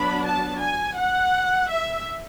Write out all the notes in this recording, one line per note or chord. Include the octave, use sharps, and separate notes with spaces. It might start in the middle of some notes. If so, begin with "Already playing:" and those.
Already playing: F#3 B3 D4 B5
A5
G#5
F#5
E5